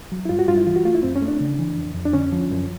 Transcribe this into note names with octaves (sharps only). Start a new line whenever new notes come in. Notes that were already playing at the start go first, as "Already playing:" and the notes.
F#3
E4
G2 F4
F#4
G2 F4
E4
E3 F4
F#4
A3 F4
E4
F#2 C4
C#4
A3
D4
C#3
E3
F2
F2
D4
D3 C#4
F3
F#2